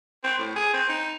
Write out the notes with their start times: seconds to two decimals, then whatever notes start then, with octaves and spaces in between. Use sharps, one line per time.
0.24 C4
0.39 A2
0.56 G#4
0.73 C4
0.89 D#4